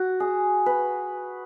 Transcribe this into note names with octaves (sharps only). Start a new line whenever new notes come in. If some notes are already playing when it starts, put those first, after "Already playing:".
Already playing: F#4
G#4
B4